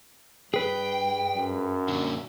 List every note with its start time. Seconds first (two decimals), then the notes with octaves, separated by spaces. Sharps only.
0.54 G2 G#4 B4 G5
1.36 F#2
1.88 A#2 D3